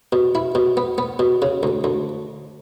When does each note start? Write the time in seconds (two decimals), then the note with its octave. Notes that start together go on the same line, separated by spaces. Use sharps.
0.13 B2
0.35 E4
0.55 B2
0.77 B3
0.98 B3
1.19 B2
1.42 C#3
1.63 D2
1.84 D2